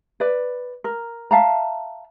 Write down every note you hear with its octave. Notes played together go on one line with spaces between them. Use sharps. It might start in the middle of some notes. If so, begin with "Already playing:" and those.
B4 D5
A#4
E5 F5 A5 A#5